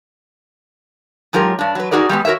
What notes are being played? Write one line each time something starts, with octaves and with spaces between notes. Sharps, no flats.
G#2 F#3 F4 G4 A#4
G2 D4
F#3 B4
D#4 F4 F#4 G#4 A#4 D5
G3 G#3 A#3 B3
F#4 A#4 C#5 E5